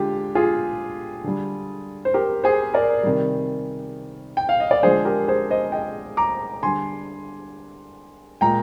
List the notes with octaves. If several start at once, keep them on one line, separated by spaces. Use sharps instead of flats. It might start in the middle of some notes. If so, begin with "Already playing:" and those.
Already playing: D3 G#3 F4 G4
F4 G#4
D3 G3
C5
G4 A#4
G#4 C5
A#4 D5
C3 D#3 G3
G5
F5
D#5
D5
D3 F3 G#3 G#4 C5
G4 A#4
G#4 C5
C5 D#5
D#5 G5
A#5 D6
D3 G3 G#5 C6
A#2 G#3 G5 A#5